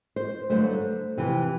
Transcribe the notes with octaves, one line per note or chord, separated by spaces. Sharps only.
C5
G2 D3 F#3 A3 C5
F2 C3 E3